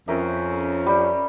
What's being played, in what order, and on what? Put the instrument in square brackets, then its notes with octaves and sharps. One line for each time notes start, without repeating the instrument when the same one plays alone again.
[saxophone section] F2 C#4 [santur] A#4 E5
[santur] G3